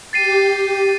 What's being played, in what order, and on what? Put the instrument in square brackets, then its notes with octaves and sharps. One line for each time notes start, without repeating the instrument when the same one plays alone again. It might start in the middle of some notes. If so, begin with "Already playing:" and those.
[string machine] G4 [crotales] A6 C7 D#7